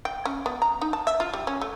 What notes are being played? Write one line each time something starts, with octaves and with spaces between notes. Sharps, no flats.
G5
C#4
B3
A#5
D#4
A5
E5
F4
G3
C#4
A3